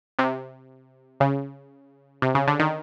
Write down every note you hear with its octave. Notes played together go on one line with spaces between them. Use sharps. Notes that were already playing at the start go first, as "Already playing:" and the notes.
C3
C#3
C3
C#3
D3
D#3